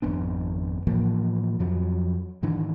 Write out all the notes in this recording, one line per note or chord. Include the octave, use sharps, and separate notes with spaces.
G#1 F2 B3 D4
A2 E3 F3 A#3
F2 F3 F#3
G#2 D#3 E3 D4